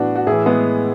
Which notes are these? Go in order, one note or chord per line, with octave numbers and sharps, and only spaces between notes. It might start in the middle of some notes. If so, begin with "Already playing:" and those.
Already playing: A2 E3 B3 D4 F#4
F#4
A2 E3 E4 G#4
G#3 B3